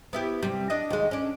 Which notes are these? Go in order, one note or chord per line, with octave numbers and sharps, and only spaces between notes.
B3 E4 G4
C3 G3
D4 D#5
D#2 G#3
C#4 D4